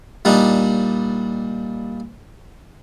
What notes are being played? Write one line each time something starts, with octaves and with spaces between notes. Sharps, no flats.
A#2 G3 D4 D#4